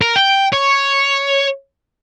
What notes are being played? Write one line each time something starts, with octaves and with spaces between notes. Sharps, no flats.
A#4
G5
C#5